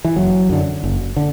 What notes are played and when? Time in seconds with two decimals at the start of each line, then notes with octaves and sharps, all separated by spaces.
0.05 E3
0.16 F#1 F#3
0.49 F#2 D3
0.84 F#1
1.16 D3